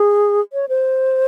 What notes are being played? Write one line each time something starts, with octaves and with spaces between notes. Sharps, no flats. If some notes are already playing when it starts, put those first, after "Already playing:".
Already playing: G#4
C#5
C5